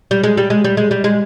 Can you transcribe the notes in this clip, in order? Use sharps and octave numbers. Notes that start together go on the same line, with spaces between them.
G3
G#3
G3
G#3
G3
G#3
G3
G#3